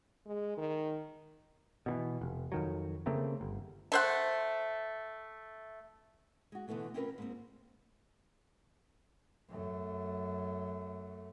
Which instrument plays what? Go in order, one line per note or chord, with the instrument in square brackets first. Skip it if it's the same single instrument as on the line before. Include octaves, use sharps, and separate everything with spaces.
[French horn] G#3
D#3
[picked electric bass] B2 D#3 E3
F1
F2 D#3 F#3
C#3 A3 A#3 C4
G1
[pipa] A3 C5 F#5
[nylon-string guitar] G#3 F#4
B2 D3 E3 A3 B3
C4 C#4 E4 F4 A#4 B4
G#2 A#3 C4
[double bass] F#2 A3